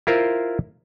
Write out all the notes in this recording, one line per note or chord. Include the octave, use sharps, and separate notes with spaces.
E4 F4 A#4 C5